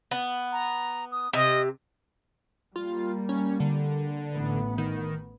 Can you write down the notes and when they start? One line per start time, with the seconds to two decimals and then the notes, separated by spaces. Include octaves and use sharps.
0.11 B3
0.52 A#5
1.11 D#6
1.33 C3 D#5
2.76 G3 A#3 F4
3.29 C#4
3.60 D3
4.33 A1 B3
4.78 D#3